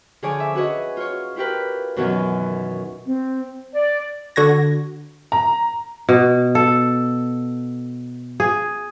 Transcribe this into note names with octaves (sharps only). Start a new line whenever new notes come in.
D3 F3 G#4 C#5 G#5 D6
E5
C#4 F#4 B4 C#5 D#5
F4 C#5
E4 F4 G4 A#4 B4
F#2 B2 D#3 E3 F#3 C#4
C4
D5
D3 F#4 G#6 A#6
A#5
B2
A4
G#4